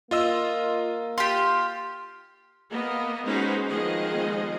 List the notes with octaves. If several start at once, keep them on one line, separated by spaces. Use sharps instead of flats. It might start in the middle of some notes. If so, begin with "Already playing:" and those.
A#3 F4 D#5 E6
F4 G4 C6
A#3 B3 D#5
G#3 C#4 D#4 F#4 B4 C5
D#3 F3 G#3 B3 G#4 D#5